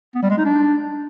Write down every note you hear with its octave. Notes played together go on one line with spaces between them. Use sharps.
B3
G3
G#3
D#4
D4